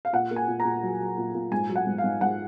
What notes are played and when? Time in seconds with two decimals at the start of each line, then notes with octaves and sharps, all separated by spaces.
0.05 F5
0.13 A#2 F#5
0.31 A#3
0.36 G#5
0.48 A#2
0.60 A#5
0.65 A#2
0.83 F#3
1.00 F#3
1.18 A#2
1.35 A#2
1.52 G#2 G#5
1.69 F#3
1.76 F#5
1.87 G#2
1.98 F5
2.04 G#2
2.21 G#2 F#5